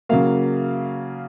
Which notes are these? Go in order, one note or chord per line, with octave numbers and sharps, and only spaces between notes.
C#3 F#3 A#3 F5